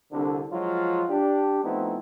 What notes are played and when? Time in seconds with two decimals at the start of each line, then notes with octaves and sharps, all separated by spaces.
0.12 C2 D3
0.52 F3 F#3 G#3 F4
1.09 D4 G4
1.64 F3 A3 B3 C4 D#4 E4